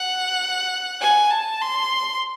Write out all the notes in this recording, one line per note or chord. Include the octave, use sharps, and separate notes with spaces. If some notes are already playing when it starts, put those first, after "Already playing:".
Already playing: F#5
G#5
A5
C6